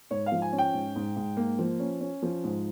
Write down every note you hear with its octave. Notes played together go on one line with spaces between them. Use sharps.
G#2 C#5
F5
F3
G#5
C#4
G5
G#2
G#2
G#2
A#3
F3
C#4
C#4
F3
G#2